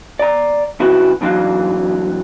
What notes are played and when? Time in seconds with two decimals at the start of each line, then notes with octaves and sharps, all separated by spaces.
0.19 D5 A#5
0.80 C#2 E4 F#4 B4
1.21 D2 G#2 E3 F#3 D4 F5